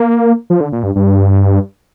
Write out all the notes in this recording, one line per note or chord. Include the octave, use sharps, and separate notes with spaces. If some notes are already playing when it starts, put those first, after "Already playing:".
Already playing: A#3
F3
D3
A#2
G2
G2